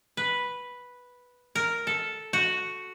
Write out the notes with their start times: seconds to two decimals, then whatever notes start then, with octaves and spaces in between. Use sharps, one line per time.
0.17 B4
1.55 A#4
1.87 A4
2.33 F#4